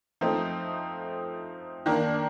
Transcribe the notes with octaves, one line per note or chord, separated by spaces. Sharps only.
F3 A3 C4 D#4
D#3 A#3 D4